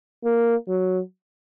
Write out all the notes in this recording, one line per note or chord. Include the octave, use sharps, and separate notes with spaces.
A#3
F#3